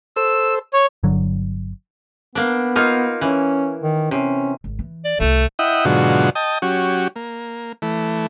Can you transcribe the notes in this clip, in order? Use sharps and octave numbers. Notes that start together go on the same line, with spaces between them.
A4 C5 E6
C#5
G1 D3 F#3
A#3 B3 D4
A#3 D#4 F4
E3 C#4
D#3
C3 C#4
G#1
E3
D5
C2 A3 F4
E4 D#5 E5 F#5 G5 D#6
G#2 B2 D3 F#3 F4 F#4
D#5 G5 A5 D#6
F#3 C#4 F#4 G4
A#3
E3 A3